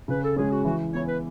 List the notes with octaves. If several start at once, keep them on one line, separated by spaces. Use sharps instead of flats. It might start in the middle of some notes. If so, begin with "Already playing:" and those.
C#3 B4
A4
G#3 C#4 G#4
F#4
E3 F#4
B3 E4 C#5
B4